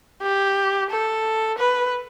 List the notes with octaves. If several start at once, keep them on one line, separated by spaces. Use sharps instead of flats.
G4
A4
B4